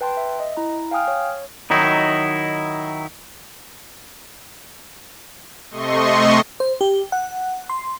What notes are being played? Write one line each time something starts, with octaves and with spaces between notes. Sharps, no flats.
B4 G5 A5 C6
E5
D#5
E4 A#5
F5 G5 G#5 D#6 F6
C#5
D#3 F#3 D#4 E4
C3 A3 D#5 C6 C#6
C5
G4
F#5
C6